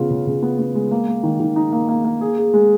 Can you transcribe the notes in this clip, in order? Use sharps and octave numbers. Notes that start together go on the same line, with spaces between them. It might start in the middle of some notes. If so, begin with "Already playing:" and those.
Already playing: C#3 B3 F4
C#3
C#3
B3
B3
G#3
A#3
A#3
D#3
D#3
D#4
A#3
A#3
A#3
G#4
G#4
G#3